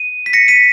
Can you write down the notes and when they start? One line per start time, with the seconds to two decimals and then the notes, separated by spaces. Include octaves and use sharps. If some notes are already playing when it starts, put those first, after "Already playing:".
Already playing: D#7
0.26 B6
0.33 A#6 C#7
0.48 B6 D#7